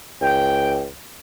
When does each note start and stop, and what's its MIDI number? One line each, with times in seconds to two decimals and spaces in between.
0.21 0.88 37
0.21 0.81 79